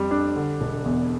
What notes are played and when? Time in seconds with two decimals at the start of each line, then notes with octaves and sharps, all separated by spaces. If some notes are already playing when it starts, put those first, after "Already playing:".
Already playing: F2 G3
0.11 D4
0.36 D3
0.61 E1
0.86 E2